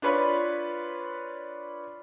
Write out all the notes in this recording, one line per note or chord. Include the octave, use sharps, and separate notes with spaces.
D4 F4 B4 C#5 B5